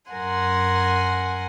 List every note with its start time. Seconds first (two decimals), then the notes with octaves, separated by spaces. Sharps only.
0.11 F#2 A#4 F#5 G#5 C6